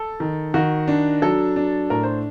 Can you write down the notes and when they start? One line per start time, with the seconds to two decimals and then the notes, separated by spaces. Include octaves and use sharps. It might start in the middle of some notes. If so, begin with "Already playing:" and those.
Already playing: A4
0.20 D#3
0.54 D#3 F#4
0.88 D4
1.22 F#3 A4
1.56 D4
1.90 A2 A#4
2.03 C5